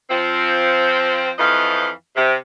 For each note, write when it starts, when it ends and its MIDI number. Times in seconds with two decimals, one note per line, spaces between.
0.10 1.31 53
0.10 1.31 60
1.39 1.89 41
1.39 1.89 52
1.39 1.89 53
1.39 1.89 75
1.39 1.89 77
2.16 2.35 48